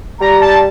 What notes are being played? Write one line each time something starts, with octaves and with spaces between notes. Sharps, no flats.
G3 A#5
A5